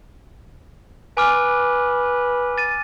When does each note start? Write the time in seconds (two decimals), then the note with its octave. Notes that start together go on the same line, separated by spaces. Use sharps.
1.17 B4 G#5 D6 F6
2.58 A6 D#7